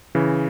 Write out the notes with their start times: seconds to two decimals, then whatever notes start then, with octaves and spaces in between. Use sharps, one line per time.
0.15 C#3 E3